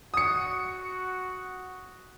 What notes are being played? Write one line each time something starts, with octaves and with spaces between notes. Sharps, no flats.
F#4 D#6 C#7